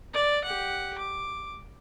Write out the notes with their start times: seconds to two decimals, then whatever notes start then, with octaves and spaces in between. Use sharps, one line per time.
0.14 D5
0.44 G4 F#5
0.99 D6